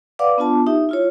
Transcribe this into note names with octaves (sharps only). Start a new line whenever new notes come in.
B4 D5 F5 F#5 D6
B3 D4 F4 A5
D#4 G4 E5
E4 F4 C#5